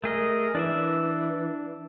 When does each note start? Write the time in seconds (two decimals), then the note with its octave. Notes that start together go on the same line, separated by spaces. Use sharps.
0.04 A3 G#4 A#4 D#5
0.55 E3 D4 D5 E5